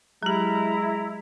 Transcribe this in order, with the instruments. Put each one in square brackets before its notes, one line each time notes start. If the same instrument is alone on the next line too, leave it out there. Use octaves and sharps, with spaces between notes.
[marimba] F#3 G4 [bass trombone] G#3 [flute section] E4 [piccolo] A#5